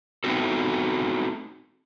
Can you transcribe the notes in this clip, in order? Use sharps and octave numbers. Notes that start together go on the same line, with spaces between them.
A3 B3 C4 D#4 F#4 A4